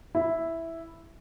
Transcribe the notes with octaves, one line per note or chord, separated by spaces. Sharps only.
E4